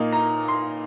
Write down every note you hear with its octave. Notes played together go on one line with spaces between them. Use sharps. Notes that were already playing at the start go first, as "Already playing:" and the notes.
Already playing: A#2 A#3 D#4
A#5
C6